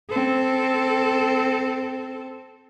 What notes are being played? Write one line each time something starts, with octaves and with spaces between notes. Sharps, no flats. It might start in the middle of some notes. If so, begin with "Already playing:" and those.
C4 A4